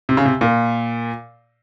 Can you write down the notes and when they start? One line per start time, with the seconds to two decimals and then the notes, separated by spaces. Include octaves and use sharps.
0.09 C3
0.17 C#3
0.25 C3
0.41 A#2